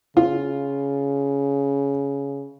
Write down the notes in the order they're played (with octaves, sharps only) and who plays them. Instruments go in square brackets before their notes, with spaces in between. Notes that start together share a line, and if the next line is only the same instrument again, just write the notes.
[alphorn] C#3 [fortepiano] F4